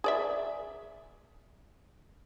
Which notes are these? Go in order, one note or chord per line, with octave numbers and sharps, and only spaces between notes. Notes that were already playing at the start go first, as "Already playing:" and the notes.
G#4 D5 E5